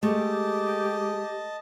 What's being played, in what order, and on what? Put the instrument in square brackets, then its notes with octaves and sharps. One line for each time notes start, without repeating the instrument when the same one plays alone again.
[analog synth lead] G#3 [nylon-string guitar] A3 [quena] G4 [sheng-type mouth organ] D#5 A5